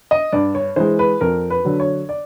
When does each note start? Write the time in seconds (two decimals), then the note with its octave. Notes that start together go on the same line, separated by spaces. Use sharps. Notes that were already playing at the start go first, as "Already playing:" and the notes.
0.11 D#5
0.33 G2 D5
0.55 C#5
0.76 E3 G#3 C5
0.99 B4
1.21 F2 A#4
1.50 B4
1.65 D3 F#3
1.80 C#5
2.09 D5